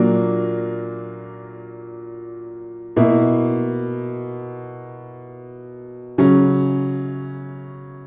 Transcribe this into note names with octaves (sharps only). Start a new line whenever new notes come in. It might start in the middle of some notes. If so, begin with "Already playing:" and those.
Already playing: A#2 F#3 A#3 D4
B2 A#3 E4
C#3 F#3 C#4